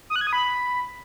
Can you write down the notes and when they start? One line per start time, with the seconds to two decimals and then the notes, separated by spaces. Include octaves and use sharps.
0.10 D#6
0.16 F#6
0.21 G#6
0.27 D#6
0.33 B5